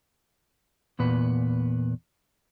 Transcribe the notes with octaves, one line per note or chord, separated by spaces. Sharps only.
E2 A#2 B3 B4